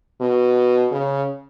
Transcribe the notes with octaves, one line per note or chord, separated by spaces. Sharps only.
B2
C#3